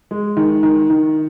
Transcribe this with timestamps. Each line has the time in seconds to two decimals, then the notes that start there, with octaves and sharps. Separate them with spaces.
0.11 G#3
0.37 D#3
0.63 D#3
0.90 D#3